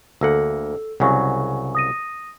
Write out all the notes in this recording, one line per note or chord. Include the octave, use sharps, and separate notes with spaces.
D2 A#3 A4 F#5 E6
C2 C#3 F#3 F#5 G#5 C#6
D#6 A#6 D#7